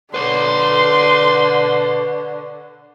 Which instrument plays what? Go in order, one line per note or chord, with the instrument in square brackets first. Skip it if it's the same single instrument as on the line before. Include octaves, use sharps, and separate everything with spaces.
[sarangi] D3 [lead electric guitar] B4 C#5 [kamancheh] C6